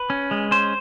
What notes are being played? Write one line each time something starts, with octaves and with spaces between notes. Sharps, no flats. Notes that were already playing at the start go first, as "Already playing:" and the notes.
Already playing: B4
C#4
G#3
C#4 C5